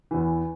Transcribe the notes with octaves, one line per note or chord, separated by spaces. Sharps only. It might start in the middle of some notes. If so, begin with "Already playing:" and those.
E2 E3